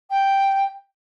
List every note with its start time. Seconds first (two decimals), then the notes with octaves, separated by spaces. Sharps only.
0.10 G5